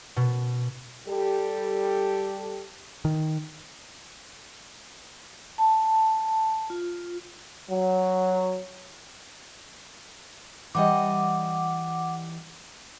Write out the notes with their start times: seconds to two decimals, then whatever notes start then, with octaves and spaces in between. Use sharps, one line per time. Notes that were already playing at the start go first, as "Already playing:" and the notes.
0.16 B2
1.06 G3 G4 A4
3.05 D#3
5.58 A5
6.70 F4
7.70 F#3
10.75 E3 G3 D#5 F#5 D6